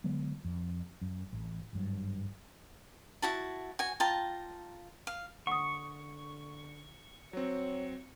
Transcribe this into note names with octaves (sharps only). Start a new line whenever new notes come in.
D3 F#3 G#3 B3
F2
F#2
A1
G#1 G2 F#3
E4 F#4 A5
F#4 G#5
F4 G5 A5 A#5
F5
D3 F#5 C#6 D#6
F#3 C4 C#5